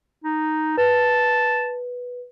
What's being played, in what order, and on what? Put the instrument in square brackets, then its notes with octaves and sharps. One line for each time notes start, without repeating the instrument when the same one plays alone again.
[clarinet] D#4
[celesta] B4 [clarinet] A5